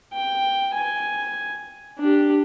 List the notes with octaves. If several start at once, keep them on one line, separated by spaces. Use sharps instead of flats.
G5
G#5
D4 G4